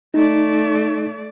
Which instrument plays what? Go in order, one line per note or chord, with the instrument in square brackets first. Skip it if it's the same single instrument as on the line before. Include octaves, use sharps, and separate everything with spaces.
[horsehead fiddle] A3 D5 [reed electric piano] D#4